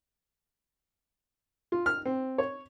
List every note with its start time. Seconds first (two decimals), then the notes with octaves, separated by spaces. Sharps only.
1.72 F4
1.86 F6
2.05 C4
2.38 C#5